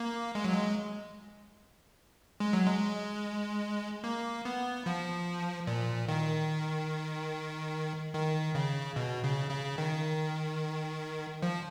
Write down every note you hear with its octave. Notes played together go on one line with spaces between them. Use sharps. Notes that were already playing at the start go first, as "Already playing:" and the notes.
Already playing: A#3
G#3
F#3
G#3
G#3
F#3
G#3
A#3
B3
F3
A#2
D#3
D#3
C#3
B2
C#3
C#3
D#3
F3